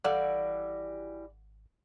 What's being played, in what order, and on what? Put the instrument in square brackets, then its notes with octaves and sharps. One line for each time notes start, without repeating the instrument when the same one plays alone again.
[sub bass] G#1 [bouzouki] E3 G3 F#4 [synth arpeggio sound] A4 F5 F#5 [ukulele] D5